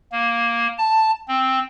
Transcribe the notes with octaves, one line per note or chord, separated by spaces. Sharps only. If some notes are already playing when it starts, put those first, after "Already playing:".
A#3
A5
C4